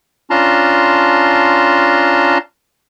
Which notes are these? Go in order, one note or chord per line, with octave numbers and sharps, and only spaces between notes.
C#4 D4 F4 A5 A#5 C6